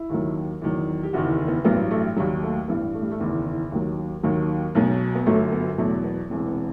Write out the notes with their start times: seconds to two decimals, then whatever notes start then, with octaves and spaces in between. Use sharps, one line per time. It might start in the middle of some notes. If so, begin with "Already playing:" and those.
Already playing: E4
0.10 D#2 D#3 F#3
0.62 E2 D#3 F#3
1.03 G4
1.13 F#1 E2 D#3 F#4
1.30 G4
1.48 B3
1.65 A1 G2 F#3 B3
1.91 A3
2.16 D#2 D#3 F#3 G3
2.43 A3
2.68 A1 G2 E3 B3
2.94 A3
3.02 G3
3.11 A3
3.20 F#1 E2 D#3 B3
3.72 D#2 D#3 F#3
4.23 D#2 D#3 F#3
4.75 B1 B2 F#3
5.15 B3
5.26 G1 F#2 F#3 A3
5.52 B3
5.78 E2 B2 F#3 A3
6.04 B3
6.30 E1 E2 C3
6.47 B3